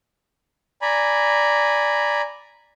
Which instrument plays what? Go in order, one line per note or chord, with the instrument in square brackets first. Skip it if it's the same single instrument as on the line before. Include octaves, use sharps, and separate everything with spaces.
[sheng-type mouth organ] D5 G#5 A#5 B5